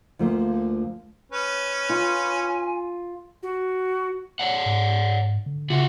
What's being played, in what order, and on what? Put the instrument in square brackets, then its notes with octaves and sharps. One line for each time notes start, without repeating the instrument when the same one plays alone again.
[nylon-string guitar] D2 F3 A3 A#3
[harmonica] C#4 B4
[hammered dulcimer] F4 [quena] G#5
[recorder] F#4
[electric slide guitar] C#5 D5 F#5
[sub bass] G#2
D3
[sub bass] C#3 [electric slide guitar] F4 F#4 G#4